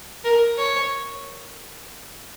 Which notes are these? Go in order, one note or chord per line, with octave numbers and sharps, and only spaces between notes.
A#4
C#5